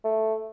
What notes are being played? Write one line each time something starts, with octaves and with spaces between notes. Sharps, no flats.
A3